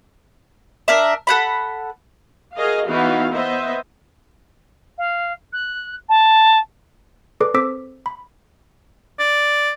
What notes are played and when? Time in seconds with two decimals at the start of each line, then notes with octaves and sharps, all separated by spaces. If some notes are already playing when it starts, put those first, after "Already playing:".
0.88 D4 A#4 E5
1.27 A4 F#5 B5
2.56 F#4 G#4 A#4 D#5 F5
2.88 E3 B3 D#4 F#4 F5
3.32 B3 C5 D#5 E5
4.98 F5
5.52 F#6
6.09 A5
7.40 G#4 A4 B4 D5 D6
7.54 C4 A4 C5 D6 E6 B6
8.06 B5
9.19 D5